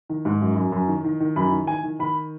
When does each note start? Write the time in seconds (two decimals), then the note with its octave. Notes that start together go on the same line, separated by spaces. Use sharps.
0.10 D#3
0.25 G#2
0.41 F#2
0.56 F#2
0.72 F#2
0.88 D#3
1.04 D#3
1.20 D#3
1.36 F#2 B5
1.52 D#3
1.67 D#3 G#5
1.83 D#3
1.99 D#3 B5